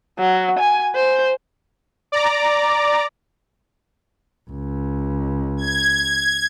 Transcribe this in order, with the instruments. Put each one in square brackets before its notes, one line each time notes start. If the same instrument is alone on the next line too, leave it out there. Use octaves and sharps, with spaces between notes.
[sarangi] F#3
G#5
C5
[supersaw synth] D5 A#5 D6
[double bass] C#2
[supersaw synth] G#6